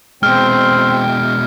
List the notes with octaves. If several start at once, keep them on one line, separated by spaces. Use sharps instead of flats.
B2 G#3 C4 G5 F6